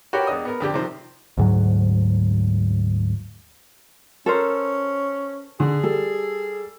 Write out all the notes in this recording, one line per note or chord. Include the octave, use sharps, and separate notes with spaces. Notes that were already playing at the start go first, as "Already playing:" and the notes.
F#4 G4 A#4 B4 C#5 G5
E1 D4 D#5 D#6
B3 A#4
F2 D3 G4
C3 D#3 F3 C5
D2 G#2 F#3
C#4 A4 A#4 C5
D3 G#4
G3 A4